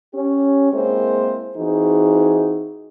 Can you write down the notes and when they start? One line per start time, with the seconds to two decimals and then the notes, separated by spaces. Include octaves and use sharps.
0.15 C#4 G4
0.73 G#3 A#3 C4 E4 A#4 C5
1.57 E3 C4 D#4 F#4 G#4